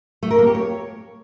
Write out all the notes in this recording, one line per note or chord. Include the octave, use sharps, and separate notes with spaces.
A3
A#4
A#3
G4
C#5